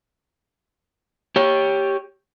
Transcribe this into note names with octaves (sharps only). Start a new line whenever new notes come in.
G4 C#5